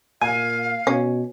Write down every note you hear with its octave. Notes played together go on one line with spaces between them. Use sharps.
A#2 F5 G#5
B2 C#4